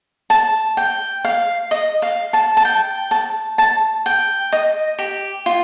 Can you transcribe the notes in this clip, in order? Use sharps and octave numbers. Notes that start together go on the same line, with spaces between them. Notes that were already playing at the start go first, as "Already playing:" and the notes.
A5
G5
F5
D#5
F5
A5
A5
G5
A5
A5
G5
D#5
G4
F4